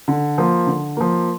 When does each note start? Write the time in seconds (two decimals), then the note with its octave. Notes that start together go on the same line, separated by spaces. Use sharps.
0.08 D3
0.38 F3 A#3
0.67 D3
0.97 F3 A#3